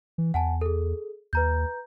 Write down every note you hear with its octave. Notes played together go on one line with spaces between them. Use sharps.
E3
E2 F#5 G#5 A5
G#4 A4
D#2 B4 A#5 G6